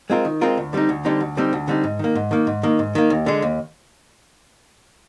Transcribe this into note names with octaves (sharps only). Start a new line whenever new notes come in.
G#3 C4 F4 A#4
D#3
G#3 C4 F4 A#4
D2
D3 G3 C4 D#4
D2
D3 G3 C4 D#4
D2
D3 G3 C4 D#4
D2
D3 G3 C4 D#4
G#2
D#3 A#3
G#2
D#3 A#3
G#2
D#3 A#3
G#2
D#3 A#3
D#2
D3 G#3
D#2